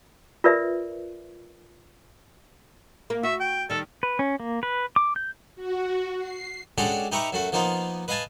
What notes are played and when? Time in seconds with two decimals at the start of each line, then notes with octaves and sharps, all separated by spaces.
0.44 F4 A#4 B4 D5 E5
3.10 A#3
3.23 F#4 E5
3.40 G5
3.70 D#3 G3 A4
4.03 B4
4.19 C#4
4.40 A#3
4.63 B4
4.96 D6
5.16 G6
5.56 F#4
6.18 C7
6.78 G#3 C#4 D4 F#4 G4 A4
7.12 D#4 G4 B4 E5 A#5 C#6
7.33 F#2 A3 F#4
7.52 F3 A#3 B3 D#4 F4
8.08 B4 D#5 F5 G#5 A5